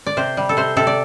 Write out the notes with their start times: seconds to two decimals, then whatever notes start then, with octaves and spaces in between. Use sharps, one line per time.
0.07 D5
0.17 C3 C5
0.37 G3
0.49 A4
0.57 C3 C5
0.77 C3 A4
0.87 D5